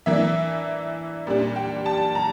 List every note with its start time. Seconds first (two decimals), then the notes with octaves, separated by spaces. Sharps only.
0.06 E3 A#3 D4 E5
1.27 A#2 G3 D4
1.56 G5
1.86 A5
2.15 A#5